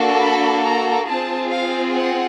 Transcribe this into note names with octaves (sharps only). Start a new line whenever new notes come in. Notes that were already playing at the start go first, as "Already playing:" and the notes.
Already playing: A#3 D4 F#4 A4
B5
A#5
C4 F4 G#4 A5
F5
F#5